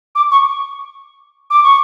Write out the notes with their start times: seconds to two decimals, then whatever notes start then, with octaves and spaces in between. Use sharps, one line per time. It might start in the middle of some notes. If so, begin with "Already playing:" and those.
0.15 D6
0.31 C#6
1.50 D6
1.64 C#6